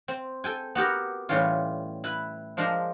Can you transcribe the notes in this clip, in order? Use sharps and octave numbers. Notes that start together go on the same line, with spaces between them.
C4
A4 G5 G#5
B3 F#4 G4 A#4
A2 E3 G3 C#4 F4
E4 B4
F3 G#3 D4 A#4 C5